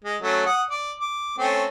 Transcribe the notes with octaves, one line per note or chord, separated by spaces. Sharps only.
G#3
F#3 A3 C#4
F#5 D#6
D5
D6
A3 C4 C#4